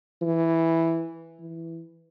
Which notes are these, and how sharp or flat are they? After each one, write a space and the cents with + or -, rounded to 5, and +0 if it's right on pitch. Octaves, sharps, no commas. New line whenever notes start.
E3 +0
E3 +5